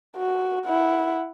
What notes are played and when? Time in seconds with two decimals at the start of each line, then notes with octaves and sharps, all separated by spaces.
0.17 F#4
0.66 E4 F#5